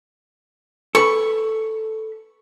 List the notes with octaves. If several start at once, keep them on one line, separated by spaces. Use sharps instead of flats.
A4 B4 B5 C#6